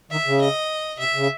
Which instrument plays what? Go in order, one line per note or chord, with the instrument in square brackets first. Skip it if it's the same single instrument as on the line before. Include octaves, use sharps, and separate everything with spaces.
[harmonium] D#3 [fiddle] E5
[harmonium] C#3
[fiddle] D#5
[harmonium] C3 [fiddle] E5
[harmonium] C#3